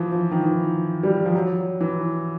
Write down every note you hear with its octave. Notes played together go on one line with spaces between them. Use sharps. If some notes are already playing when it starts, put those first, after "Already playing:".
Already playing: E3 F3
F3
D#3
E3
G3
F3
F#3
E3